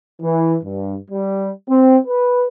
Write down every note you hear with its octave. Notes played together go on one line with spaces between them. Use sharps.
E3
G2
G3
C4
B4